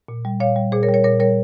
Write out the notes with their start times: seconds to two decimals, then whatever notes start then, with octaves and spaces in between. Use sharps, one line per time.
0.08 A#2
0.25 G3
0.40 A#2 C#5 F5
0.56 G3
0.72 A#2 G#4 C5
0.83 A#4 C#5
0.89 G3
0.94 A#4 C#5
1.04 A#2 A#4 C#5
1.20 G3 A#4 C#5